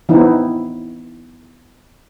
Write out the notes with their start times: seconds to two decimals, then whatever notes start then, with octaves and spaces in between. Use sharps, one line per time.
0.09 E3 B3 C4 D#4 E4